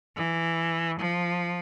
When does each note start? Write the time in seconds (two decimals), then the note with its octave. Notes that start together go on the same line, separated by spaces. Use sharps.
0.16 E3
1.00 F3